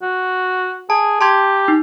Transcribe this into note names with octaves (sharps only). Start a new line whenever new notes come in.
F#4
G#4 A5
G4 A5 C6 G#6
D#4